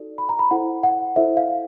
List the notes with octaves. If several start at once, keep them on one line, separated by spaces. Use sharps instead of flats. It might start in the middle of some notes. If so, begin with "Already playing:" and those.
Already playing: D#4 F#4 A4 D5
B5
A#5
B5
E4 A4 C5 F#5
F#5
E4 A4 C5 E5
F5